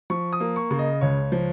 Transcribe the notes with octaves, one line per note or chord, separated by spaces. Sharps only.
F3 C#6
D#6
A#3
C#6
C#3
D#5
C#2 C#5
F3